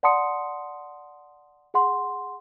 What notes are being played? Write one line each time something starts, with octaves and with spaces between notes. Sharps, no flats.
D5 F#5 A5 C6 D#6 C#7
G#4 F#5 C6